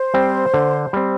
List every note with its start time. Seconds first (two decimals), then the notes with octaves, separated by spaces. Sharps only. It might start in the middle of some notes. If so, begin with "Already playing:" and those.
Already playing: C5
0.14 G3 C4
0.54 D3
0.93 G3 C4